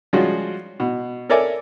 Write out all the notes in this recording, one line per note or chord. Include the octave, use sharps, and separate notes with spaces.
F3 G3 G#3 C#4 F4 F#4
B2
A4 A#4 C#5 D5 E5 G#5